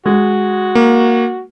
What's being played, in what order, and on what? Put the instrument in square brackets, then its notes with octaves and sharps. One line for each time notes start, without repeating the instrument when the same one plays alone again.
[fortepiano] G#3 [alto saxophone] F#4
[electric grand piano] A#3